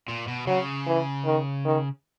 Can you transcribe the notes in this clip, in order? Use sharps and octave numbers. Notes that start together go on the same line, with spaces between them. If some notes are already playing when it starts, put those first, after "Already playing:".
A#2
B2
C#3 F#3
E3
D#3
D#3